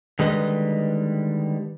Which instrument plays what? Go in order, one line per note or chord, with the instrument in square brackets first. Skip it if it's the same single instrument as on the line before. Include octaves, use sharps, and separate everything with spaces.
[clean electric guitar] D3 D#3 G3 G#3 B4 D#5